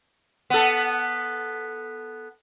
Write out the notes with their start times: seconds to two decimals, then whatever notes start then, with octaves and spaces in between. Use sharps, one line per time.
0.50 B3 A4